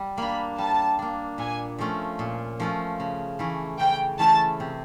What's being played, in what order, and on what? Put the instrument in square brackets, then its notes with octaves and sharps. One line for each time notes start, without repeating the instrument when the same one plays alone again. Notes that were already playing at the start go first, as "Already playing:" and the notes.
Already playing: [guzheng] G3
[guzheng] A#3 D4 [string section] B5
[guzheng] G3 [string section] A5
[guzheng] A#3 D4
[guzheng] A#2 [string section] G#5
[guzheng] F3 A3 C#4 F4
A#2
F3 A3 C#4 F4
C#3
E3 A3 C#4
[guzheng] C#3 [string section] G5
[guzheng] E3 A3 C#4 [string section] A5
[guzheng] C3